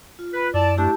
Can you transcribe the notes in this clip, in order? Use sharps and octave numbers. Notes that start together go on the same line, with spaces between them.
F4
B4
F#2 E4 D5 A5
A3 D4 E4 G4 A5